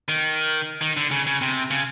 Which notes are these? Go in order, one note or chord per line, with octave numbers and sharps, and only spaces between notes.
D#3
D#3
D3
C#3
C#3
C3
C#3